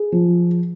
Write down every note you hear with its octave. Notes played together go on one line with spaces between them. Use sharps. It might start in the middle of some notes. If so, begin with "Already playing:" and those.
Already playing: G#4
F3